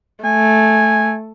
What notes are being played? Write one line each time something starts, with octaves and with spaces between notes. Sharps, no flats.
A3 G#5